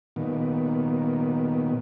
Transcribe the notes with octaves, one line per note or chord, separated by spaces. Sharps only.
A#2 D#3 B3